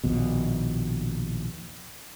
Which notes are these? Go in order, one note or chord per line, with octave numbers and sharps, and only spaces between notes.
A#1 D#2 B2